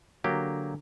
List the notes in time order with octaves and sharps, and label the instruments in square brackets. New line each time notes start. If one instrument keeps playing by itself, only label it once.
[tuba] D3 [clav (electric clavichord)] F#3 A#3 G4